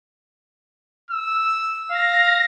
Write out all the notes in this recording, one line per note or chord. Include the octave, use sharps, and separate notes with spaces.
E6
F5 A#6